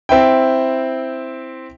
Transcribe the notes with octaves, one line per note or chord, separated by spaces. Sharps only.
C4 E4 G5